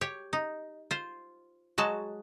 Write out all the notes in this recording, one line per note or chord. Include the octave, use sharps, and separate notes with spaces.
G4 C#5
D#4
F4 C5
F#3 G#3 F#4 A5